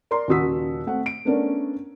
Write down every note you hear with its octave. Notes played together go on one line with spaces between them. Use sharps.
A#4 D5 A#5 C6
D#1 C#3 F#4 D#6 E6 B6
A3 C4 F#5
D7
A3 B3 C#4 D4 A#4 D5